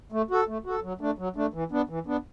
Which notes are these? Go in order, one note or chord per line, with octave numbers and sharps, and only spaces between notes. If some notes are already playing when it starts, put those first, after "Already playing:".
A3
F#4 A4
A3
F#4 A4
F#3
A3 D4
F#3
A3 D4
E3
B3 D4
E3
B3 D4